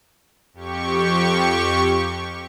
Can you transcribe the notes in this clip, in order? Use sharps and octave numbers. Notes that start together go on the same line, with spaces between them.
F2 G4 C#6